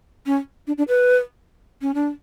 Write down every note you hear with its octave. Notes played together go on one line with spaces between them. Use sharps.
C#4
D4
D4
B4
C#4
D4